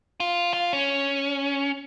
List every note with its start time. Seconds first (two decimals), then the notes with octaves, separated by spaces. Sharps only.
0.20 F4
0.53 F4
0.73 C#4